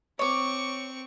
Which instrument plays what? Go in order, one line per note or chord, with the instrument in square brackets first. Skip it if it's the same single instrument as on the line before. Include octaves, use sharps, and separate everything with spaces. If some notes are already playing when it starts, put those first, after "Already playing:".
[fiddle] C4 C#6 [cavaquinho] C#5 D6